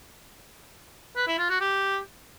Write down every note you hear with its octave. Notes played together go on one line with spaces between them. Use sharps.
B4
E4
F4
F#4
G4